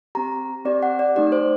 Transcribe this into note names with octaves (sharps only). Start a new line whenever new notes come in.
C4 G4 A#5
C4 G4 D5
F#5
D5
A3 D#4 G4 D5
D5
C5